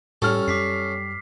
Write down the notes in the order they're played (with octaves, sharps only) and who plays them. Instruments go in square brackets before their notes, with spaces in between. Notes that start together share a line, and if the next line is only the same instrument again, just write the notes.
[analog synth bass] A2 [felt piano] G3 F6 [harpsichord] C#4 A4
[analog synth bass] F#2 [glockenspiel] D6 B6 C7